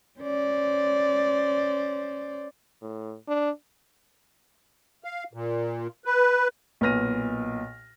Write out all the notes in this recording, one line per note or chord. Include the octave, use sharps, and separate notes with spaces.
C#4 C5 D5
A2
D4
F5
A#2
B4
B1 A#2 B4 F6 A#6 D#7